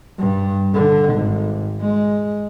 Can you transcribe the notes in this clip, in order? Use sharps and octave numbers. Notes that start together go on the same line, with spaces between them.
G2
D3
G#1
G#3